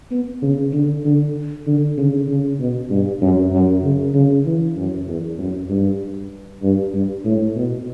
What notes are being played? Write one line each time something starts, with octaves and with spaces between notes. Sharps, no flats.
B3
C#3
D3
D3
D3
C#3
C#3
B2
G2
F#2
F#2
C#3
C#3
E3
F#2
E2
F#2
G2
G2
G2
A2
B2